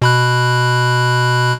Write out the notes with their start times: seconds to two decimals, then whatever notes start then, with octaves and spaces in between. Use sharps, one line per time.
0.02 B2 B5 F#6